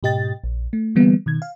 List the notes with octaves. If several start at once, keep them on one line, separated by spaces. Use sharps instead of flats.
G#2 B2 G4 D#5 G5 A6
A#1
A3
D3 E3 G3 A#3 B3
B2 D#3 G#6
F5